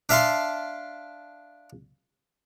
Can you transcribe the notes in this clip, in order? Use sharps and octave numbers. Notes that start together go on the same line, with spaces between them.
D4 E5 F5 A5 C6